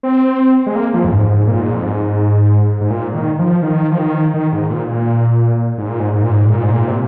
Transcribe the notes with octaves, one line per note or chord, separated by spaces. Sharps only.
C4
G#3
A#3
F3
F2
G#2
G#2
A#2
G#2
F2
G#2
G#2
A#2
D#3
F3
D#3
F3
D#3
D#3
G#2
A#2
A#2
G#2
A#2
G#2
G#2
A#2
G#2
A#2
G#2
A#2
C3